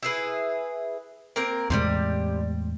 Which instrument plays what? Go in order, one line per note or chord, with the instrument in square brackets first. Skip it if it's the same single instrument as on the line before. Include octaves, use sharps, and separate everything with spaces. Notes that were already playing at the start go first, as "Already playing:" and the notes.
[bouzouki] E4 G#4 B4
A#3 C4 A#4
[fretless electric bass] E2 A2 G#3 [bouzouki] C3 F3 G3